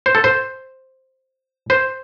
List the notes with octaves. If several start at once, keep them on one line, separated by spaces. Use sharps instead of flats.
C5
A4
C5
C5